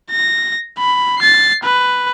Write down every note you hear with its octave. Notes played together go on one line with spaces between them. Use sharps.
A#6
B5
A6 C7
B4